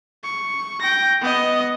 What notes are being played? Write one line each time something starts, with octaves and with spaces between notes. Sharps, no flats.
C#6
G5 A#6
B3 D#5